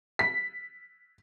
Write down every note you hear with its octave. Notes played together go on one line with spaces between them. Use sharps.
B6